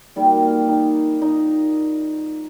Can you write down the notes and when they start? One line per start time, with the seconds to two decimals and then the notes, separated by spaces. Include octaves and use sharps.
0.16 D#3 G3 A#3 G4
0.42 F4
0.68 D#4
1.22 D#4